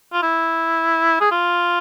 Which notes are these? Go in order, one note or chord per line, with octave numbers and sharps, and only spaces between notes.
F4
E4
G#4
F4